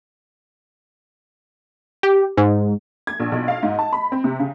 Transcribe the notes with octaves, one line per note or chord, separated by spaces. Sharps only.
G4
G#2
G#6
A#1
B1
F5
G#2
A5
B5
C4
C3
C#3